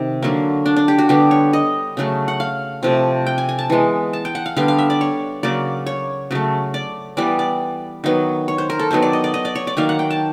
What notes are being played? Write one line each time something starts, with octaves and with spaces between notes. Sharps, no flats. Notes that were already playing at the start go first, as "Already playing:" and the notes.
Already playing: C3 D#3
D3 F#3 A#3
D4
D4
G4
F#4
D3 G3 B3 G4
C#5
D#5
C#3 F#3 A3
F#5
F5
C3 F3 A3
G5
G#5
G#5
A5
E3 G#3 B3
A5
G5
F#5
F5
D3 G3 B3 F5
F5
E5
D5
C#5
C#3 F#3 A#3 D5
C#5
C#3 F#3 A3
D5
E3 G3 B3 D5
D5
D#3 F#3 B3
C#5
C5
A#4
A4
D#3 F#3 B3 C5
D5
D#5
D5
D#5
D5
C#5
D5
D#3 F#3 A#3 F5
F#5
G5
A5